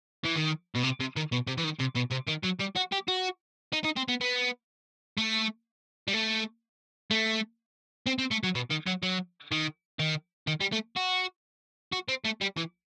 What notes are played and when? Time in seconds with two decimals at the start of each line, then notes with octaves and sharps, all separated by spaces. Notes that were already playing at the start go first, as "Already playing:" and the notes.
0.24 E3
0.36 D#3
0.75 B2
0.83 C3
1.00 C3
1.16 D#3
1.32 B2
1.48 C3
1.58 E3
1.64 D#3
1.80 C3
1.96 B2
2.12 C3
2.28 D#3
2.44 F#3
2.60 G3
2.76 F#4
2.92 G4
3.08 F#4
3.73 D#4
3.85 D#4
3.97 C4
4.09 B3
4.21 B3
5.18 A3
6.08 G3
6.13 A3
7.11 A3
8.06 C4
8.18 C4
8.31 A3
8.43 F#3
8.55 B2
8.71 D#3
8.87 F#3
9.03 F#3
9.52 D#3
9.99 D#3
10.47 D#3
10.60 G3
10.72 A3
10.96 F#4
11.92 F#4
12.08 C4
12.25 A3
12.41 G3
12.57 E3